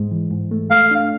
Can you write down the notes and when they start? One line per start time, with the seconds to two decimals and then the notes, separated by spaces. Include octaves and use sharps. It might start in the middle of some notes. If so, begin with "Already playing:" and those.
Already playing: G#2 G#3
0.11 E3
0.31 G#2
0.51 A3
0.70 A3 F5
0.91 D4